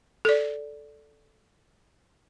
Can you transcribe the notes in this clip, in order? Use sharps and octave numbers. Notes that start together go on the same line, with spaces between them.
A4 D5